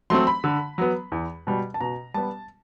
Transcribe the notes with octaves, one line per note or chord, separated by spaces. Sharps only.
F#3 A3 C4 C6
B5
D3
F#3 B3
E2
B2 G3
A5
B2 A#5
G3 B3 A5